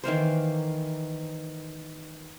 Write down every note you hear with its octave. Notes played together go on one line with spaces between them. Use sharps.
D#3 E3 A#3 C5